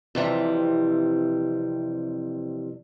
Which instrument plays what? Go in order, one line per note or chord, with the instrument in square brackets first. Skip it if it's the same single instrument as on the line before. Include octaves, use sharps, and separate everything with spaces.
[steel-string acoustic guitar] F2 C3 E3 G3